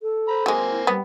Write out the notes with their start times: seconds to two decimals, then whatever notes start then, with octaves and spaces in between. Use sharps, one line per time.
0.01 A4
0.28 C5 A#5 B5
0.46 F#3 G#3 A#3 C4 G#5
0.70 E4
0.87 G3 B3